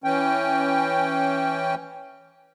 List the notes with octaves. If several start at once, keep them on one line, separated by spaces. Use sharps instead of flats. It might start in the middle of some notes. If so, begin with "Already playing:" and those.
E3 C#4 G5